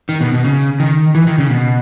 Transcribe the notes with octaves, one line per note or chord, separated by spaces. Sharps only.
D#3
B2
B2
C#3
D#3
E3
D#3
C#3
B2